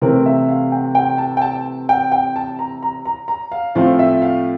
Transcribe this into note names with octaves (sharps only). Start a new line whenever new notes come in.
C3 E3 A3 C4 A#4
E5
F5
G5
G5
A5
G5
A5
G5
G5
A5
A#5
A#5
A#5
A#5
F5
A2 F3 A3 C4 F5
E5
F5